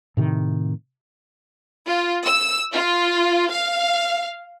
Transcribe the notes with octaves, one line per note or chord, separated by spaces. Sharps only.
A2 C3 D#3
F4
E6
F4
F5